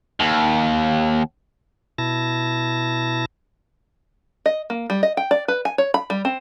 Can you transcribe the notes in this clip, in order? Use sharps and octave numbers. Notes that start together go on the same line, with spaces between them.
D#2
B2 E4 A5 A#6
D#5
A#3
G3
D#5
G5
D5
B4
G#5
C#5
B5
G3
C4